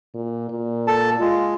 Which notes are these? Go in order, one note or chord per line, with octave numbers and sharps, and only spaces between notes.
A#2
A#2
A4 A5
G#3 F4